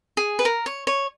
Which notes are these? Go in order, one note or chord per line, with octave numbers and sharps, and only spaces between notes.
G#4
B4
A#4
C#5
C#5